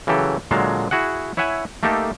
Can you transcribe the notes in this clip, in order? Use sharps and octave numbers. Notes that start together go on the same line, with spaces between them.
C#3 E3 F#3 G4 A4
A#2 D3 F#3 G#3 F5 A5
E4 F#4 G#4 F#5
E4 C#5 E5 F#5 G#5
A3 A#3 D#4 G4 A4